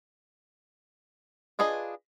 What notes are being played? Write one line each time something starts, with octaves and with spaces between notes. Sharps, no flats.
D4 F4 G#4 B4 D#5